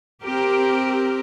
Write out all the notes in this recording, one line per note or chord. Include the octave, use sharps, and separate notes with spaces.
C4 G4 A#4